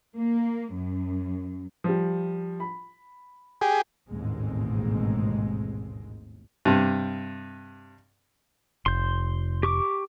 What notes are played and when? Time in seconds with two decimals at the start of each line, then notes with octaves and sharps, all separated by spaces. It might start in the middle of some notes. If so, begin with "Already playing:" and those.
0.17 A#3
0.74 F#2
1.84 F3 G3
2.60 B5
3.61 G4 G#4
4.10 A1 D#2 G#2 B2 G#3 C4
6.65 G2 C3
8.86 F1 C6 G6
9.63 G4 C#6 D6